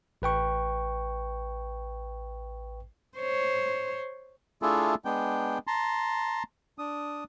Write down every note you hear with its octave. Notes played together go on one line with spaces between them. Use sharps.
A1 B4 G5 C#6
C5 C#5
A3 D4 E4 F4 G#4 A4
G#3 B3 D4 G5
A5 A#5 C6
D4 D#6